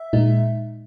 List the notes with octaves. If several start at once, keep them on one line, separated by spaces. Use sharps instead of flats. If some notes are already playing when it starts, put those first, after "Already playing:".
Already playing: E5
A#2 G#3 D#4